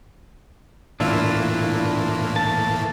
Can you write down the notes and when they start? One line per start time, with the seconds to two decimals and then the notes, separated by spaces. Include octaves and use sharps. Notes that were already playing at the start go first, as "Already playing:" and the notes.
1.00 A2 E3 A#3 D4 E4 F4
2.36 A5